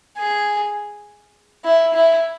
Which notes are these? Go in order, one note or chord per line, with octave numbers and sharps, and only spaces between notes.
G#4
E4
E4